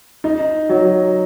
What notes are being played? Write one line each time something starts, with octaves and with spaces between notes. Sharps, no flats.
D#4
F#3